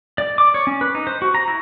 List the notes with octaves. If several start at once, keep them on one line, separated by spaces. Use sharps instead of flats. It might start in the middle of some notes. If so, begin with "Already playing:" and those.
D5
D6
C#5
C#4
B4
D#4
C5
F#4
A#5
E4